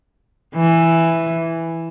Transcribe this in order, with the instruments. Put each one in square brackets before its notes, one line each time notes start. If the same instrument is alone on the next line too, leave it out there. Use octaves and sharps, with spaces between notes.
[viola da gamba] E3